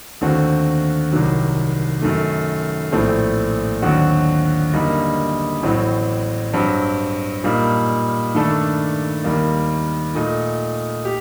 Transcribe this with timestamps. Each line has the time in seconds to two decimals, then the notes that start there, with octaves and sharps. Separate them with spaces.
0.21 D#2 D3 A3 C4 F#4
1.12 C2 C3 D#3 F#3
2.02 F#2 D#3 A3
2.92 A#1 A2 A3 C4
3.82 D#2 D3 F#3 C4 F#4
4.73 F#2 D3 G3 A#3 D#4
5.63 A1 A2 F#3 C4
6.53 G2 F#3 C4
7.44 A#2 G3 A#3 D#4
8.34 G2 D#3 A3 D4 A4
9.24 D#2 D#3 G3 A#3
10.15 A#2 A3 D#4
11.05 G4